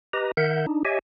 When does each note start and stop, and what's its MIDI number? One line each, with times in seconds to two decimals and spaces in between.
0.13 0.31 67
0.13 0.31 71
0.13 0.31 75
0.13 0.31 82
0.37 0.66 51
0.37 0.66 70
0.37 0.66 76
0.37 0.66 78
0.37 0.66 91
0.67 0.83 62
0.67 0.83 63
0.85 0.99 67
0.85 0.99 73
0.85 0.99 75
0.85 0.99 76
0.85 0.99 80